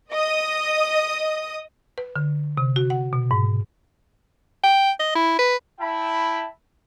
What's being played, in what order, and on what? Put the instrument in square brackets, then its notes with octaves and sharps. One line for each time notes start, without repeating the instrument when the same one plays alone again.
[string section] D#5 D#6
[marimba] B4
D3
C3
F#4
F#5
B2
G#2
[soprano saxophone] G5
D#5
E4
B4
[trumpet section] E4 E5 G5 A5 B5